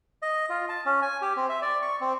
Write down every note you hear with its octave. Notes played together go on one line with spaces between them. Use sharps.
D#5
F4
A5
C#4
G#5
G4
C4
E5
D5
C#6
C4